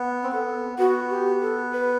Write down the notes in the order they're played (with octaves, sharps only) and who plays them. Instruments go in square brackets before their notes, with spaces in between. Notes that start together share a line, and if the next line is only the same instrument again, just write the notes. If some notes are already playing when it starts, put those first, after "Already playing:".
Already playing: [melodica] B3
C4
[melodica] B3 [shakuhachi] A4
[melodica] B3 [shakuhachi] F#4
[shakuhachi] G4
A4
B4